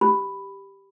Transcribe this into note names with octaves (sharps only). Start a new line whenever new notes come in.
G4 B5